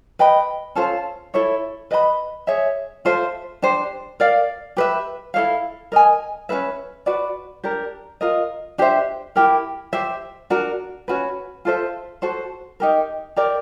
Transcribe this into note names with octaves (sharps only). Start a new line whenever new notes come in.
B4 D#5 G5 B5
C#4 F4 A4 C5
E4 A4 C#5 E5
B4 D#5 G#5 B5
G#4 C#5 E5
F4 A4 C5 E5
D4 G4 C5
A#4 D5 F5
G4 B4 E5
E4 A4 C#5 F5
A#4 D#5 G#5
C#4 F#4 B4 E5
F#4 B4 D5
D4 G4 A#4
F4 A#4 D#5
D4 G4 C5 E5
E4 G4 A#4
G4 C5 E5
D4 F#4 A#4
C#4 F#4 B4
F4 A4 C5 E5
F#4 A4 C5
D#4 G4 A#4
G4 A#4 D5